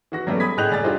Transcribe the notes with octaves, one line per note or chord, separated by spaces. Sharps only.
E3 F#4 A#6
F#3 G3 A3 B3 C#4
B5 D#6 G#6 B6
A2 G#4 D#5 F#6 G6 F7
F1 G3 G#5 A6
D4 E4 F4 G4 C5 D#5